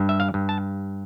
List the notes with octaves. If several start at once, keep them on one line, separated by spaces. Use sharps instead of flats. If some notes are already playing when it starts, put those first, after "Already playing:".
Already playing: G2
E5
F5
G2
A5